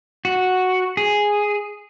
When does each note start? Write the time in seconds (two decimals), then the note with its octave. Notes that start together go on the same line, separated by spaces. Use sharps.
0.25 F#4
0.97 G#4